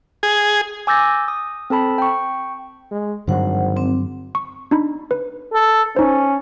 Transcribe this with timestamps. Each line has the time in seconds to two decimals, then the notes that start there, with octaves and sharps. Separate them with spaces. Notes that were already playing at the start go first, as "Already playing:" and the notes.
0.23 G#4
0.87 G#5 D6 E6 G6 A6 A#6
1.28 D#6
1.70 C4 A4 A5 B5
1.98 G5 C#6
2.91 G#3
3.28 G#1 G2 D3 F#3 C5 F#5
3.77 C4
4.35 C#6
4.71 D4 D#4 B5
5.11 B4
5.53 A4
5.96 C#4 D#4 C5